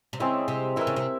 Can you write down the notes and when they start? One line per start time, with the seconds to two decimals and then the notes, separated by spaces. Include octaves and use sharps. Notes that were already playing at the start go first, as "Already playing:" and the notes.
0.13 C3
0.20 C#3 G#3 C4 E4
0.48 C3
0.76 E3 E4 A#4 E5
0.87 C#3
0.96 C3